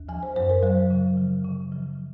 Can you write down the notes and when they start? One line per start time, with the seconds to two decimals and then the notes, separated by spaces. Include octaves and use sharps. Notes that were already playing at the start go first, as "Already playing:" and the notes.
Already playing: D#2
0.09 F3 G#5
0.23 C5
0.36 F#2 C5
0.50 A#4
0.63 F#3 C5
0.90 C#3
1.17 F3
1.44 C#3
1.72 F3